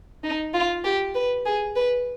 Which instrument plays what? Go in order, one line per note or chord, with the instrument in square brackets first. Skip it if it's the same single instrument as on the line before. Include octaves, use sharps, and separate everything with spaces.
[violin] D#4
F4
G4
B4
G#4
B4